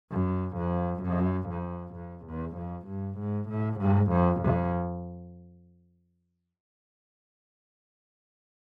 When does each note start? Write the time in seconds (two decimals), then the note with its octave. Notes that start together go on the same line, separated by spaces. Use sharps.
0.12 F#2
0.57 F2
1.03 F#2
1.50 F2
1.95 F2
2.26 E2
2.57 F2
2.88 G2
3.19 G#2
3.49 A2
3.80 G#2
4.11 F2
4.41 F2